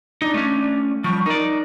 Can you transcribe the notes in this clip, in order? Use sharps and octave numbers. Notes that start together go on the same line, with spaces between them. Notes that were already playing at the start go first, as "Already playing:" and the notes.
D4 D#4
A3 C#4
F3 G3 C#6
D#4 A#4 D5